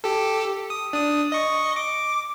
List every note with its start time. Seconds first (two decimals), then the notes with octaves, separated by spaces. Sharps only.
0.04 G4 A4
0.70 D#6
0.93 D4 D#6
1.32 D#5 C#6
1.76 D6